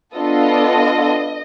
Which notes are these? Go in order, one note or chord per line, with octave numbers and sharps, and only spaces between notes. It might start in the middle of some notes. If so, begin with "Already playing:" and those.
B3 D4 F4 A4 D#5